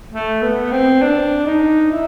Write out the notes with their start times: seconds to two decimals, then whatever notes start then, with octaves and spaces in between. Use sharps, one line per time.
0.13 A3
0.42 B3
0.72 C4
1.02 D4
1.46 D#4
1.92 E4